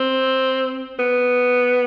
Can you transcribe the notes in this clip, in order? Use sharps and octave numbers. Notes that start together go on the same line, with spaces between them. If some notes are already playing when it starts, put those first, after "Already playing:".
Already playing: C4
B3